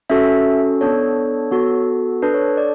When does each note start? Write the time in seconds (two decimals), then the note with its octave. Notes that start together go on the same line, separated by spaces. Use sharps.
0.10 C#4 F#4 A4 E5
0.81 B3 D4 A4 C#5
1.51 B3 F#4 A4
2.22 D4 A4 B4
2.34 C#5
2.57 D5